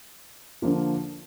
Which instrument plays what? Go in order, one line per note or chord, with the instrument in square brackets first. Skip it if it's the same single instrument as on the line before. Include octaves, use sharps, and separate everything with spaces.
[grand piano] D3 F3 A#3 F4